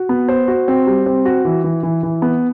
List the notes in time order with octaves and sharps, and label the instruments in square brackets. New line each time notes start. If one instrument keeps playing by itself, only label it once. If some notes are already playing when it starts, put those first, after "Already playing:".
Already playing: [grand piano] F#4
B3
C5
F#4
C4
G3
C4
F#4
E3
E3
E3
E3
B3